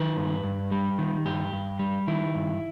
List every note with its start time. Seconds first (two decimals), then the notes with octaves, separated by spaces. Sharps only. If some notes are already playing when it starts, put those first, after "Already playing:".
Already playing: D#3 B4
0.16 G2
0.43 G2
0.71 G3
0.98 D#3
1.25 G2 G4
1.53 G2
1.79 G3
2.08 D#3 E4
2.35 G2